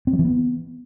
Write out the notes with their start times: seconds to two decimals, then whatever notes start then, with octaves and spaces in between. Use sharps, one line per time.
0.07 C4
0.13 F#3
0.19 E3
0.25 B3